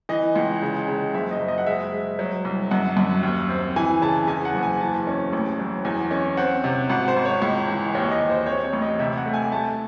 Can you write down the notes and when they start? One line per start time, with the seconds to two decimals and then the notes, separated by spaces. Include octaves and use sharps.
0.09 E3 D#5
0.35 C#2
0.62 C#3
0.88 C#3
1.14 F#1 E5
1.31 D#5
1.40 F#1
1.48 D#5
1.58 F#5
1.66 G#3 E5
1.93 G#3
2.19 F#3
2.45 C2
2.71 F#2 F#5
2.97 F#2
3.23 D#2
3.49 C4
3.76 E3 G#5
4.02 C#3 A5
4.28 E2 G#5
4.45 F#5
4.54 F#1
4.63 G#5
4.80 E3 A5
5.07 C#4
5.33 A1
5.59 F#3
5.85 E2 G#5
6.11 C#4
6.37 C4 F#5
6.64 C3
6.89 G#1 F#5
7.08 C5
7.16 G#1
7.25 C#5
7.42 C#2
7.68 E3
7.95 D#2 C#5
8.11 D#5
8.21 D#2
8.30 C5
8.46 C4 C#5
8.64 C#5
8.73 A1
8.82 D#5
8.99 C3 E5
9.17 F#5
9.26 A3
9.34 G#5
9.52 A3 A5